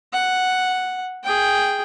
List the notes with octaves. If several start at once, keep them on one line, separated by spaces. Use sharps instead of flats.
F#5
G#4 G5